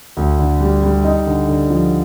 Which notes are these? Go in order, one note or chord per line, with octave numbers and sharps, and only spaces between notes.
D2
D3
G3
G3
D#4
D3
D3
F3